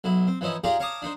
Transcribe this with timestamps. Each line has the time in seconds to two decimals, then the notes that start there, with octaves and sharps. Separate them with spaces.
0.04 B1 F#3 E4
0.28 C4
0.41 E3 F3 C#4 D#4 E4
0.64 D#4 F4 G4 G#4 D5 A#5
0.80 C#5 F5 A5 A#5 D6 D#6
1.02 D4 D#4 C5